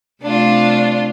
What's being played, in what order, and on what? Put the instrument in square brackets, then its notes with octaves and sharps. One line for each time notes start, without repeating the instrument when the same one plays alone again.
[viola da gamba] C3 A3 [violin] D4 F4